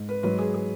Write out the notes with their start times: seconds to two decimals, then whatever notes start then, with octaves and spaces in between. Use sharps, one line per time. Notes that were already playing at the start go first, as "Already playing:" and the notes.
Already playing: G#2
0.09 B4
0.23 G#2 F#3 B4
0.39 G#4
0.54 G#4